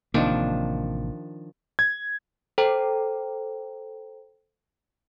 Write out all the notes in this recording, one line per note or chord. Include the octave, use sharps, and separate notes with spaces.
A1 C3 D#3 F3 A#3 D4
G#6
A4 C5 G5 A#5